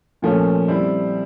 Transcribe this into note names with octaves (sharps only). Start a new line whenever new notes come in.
A#2 F3 A3 C#4
G3 C4 E4